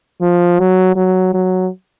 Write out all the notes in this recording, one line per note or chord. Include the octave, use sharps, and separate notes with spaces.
F3
F#3
F#3
F#3